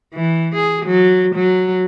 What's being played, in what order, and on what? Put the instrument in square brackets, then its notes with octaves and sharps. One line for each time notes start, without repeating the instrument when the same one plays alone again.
[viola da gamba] E3
G#4
F#3
F#3